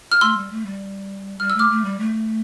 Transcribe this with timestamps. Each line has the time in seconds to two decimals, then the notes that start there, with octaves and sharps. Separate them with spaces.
0.12 F6
0.21 A3 C6 E6
0.36 G3
0.52 A3
0.65 G3
1.40 G3 F6
1.50 E6
1.55 A3 D6 F6
1.70 A3
1.84 G3
1.99 A3